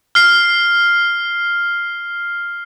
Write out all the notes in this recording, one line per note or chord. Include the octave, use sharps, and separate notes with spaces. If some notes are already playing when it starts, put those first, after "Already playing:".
F6 C7